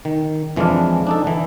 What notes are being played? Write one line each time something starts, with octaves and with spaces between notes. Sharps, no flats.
D#3
F2 E3 F3 G#3 D4 F5
D4 D#4 A4
D3 E3